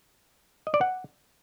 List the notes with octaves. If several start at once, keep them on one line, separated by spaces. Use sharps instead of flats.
D#5
D5
F#5